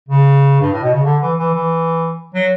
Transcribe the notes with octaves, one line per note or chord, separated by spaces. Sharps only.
C#3
G2
A2
B2
C#3
D3
E3
E3
E3
F#3